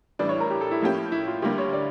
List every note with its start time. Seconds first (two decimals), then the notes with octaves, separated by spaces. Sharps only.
0.19 A2 E3 G3 D4 D5
0.29 C#5
0.40 A#4
0.50 G4
0.61 A4
0.71 E4
0.81 A2 F3 A#3 C#4 G4
1.12 E4
1.27 F4
1.42 D2 D3 G3 A#3 G4
1.58 C#5
1.73 D5